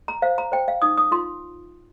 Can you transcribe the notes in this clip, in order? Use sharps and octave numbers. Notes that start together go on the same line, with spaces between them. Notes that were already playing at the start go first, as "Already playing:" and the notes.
A#5
C5 F5
A#5
C5 G5
F5
D#4 D#6
D#6
F4 C6